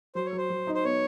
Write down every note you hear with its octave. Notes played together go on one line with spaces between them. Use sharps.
F#3 C5
C#5
F#3 C5
F#3
D#4
C5
B3 C#5